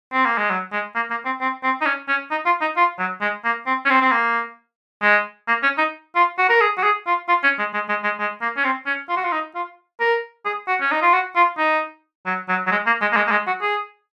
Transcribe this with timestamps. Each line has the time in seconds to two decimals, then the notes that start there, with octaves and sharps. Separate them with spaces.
0.13 C4
0.25 A#3
0.38 G#3
0.50 F#3
0.72 G#3
0.95 A#3
1.10 A#3
1.25 C4
1.41 C4
1.63 C4
1.81 D#4
1.86 C#4
2.09 C#4
2.31 D#4
2.45 F4
2.61 D#4
2.77 F4
2.99 F#3
3.21 G#3
3.44 A#3
3.67 C4
3.85 C#4
3.90 C4
4.01 C4
4.12 A#3
5.02 G#3
5.48 A#3
5.63 C#4
5.78 D#4
6.16 F4
6.38 F#4
6.49 A#4
6.61 G#4
6.78 F#4
6.83 G#4
7.06 F4
7.28 F4
7.44 C#4
7.59 G#3
7.74 G#3
7.89 G#3
8.04 G#3
8.19 G#3
8.41 A#3
8.57 C#4
8.64 C4
8.86 C#4
9.09 F4
9.16 F#4
9.24 F4
9.32 D#4
9.55 F4
10.00 A#4
10.45 G#4
10.68 F#4
10.81 C#4
10.91 D#4
11.02 F4
11.13 F#4
11.36 F4
11.58 D#4
12.26 F#3
12.49 F#3
12.67 F#3
12.71 G#3
12.86 A#3
13.02 G#3
13.12 A#3
13.17 G#3
13.27 A#3
13.31 G#3
13.47 F#4
13.62 G#4